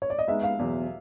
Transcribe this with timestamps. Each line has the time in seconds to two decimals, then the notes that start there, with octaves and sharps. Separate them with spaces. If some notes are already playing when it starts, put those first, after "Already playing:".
0.02 C#5
0.10 D5
0.19 D#5
0.28 G#3 B3 D#4 E5
0.43 F5
0.59 E2 B2 F#3